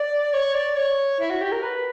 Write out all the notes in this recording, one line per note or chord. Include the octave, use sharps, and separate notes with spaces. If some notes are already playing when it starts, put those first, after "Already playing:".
Already playing: D5
C#5
D5
C#5
E4
F#4
G4
A#4
B4